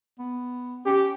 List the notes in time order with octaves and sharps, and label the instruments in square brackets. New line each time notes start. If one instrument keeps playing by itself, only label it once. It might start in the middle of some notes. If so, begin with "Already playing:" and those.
[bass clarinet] B3
[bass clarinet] C#4 [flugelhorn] G4